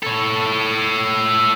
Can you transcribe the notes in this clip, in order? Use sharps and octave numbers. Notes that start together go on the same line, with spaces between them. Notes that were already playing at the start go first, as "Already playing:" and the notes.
A4 C#5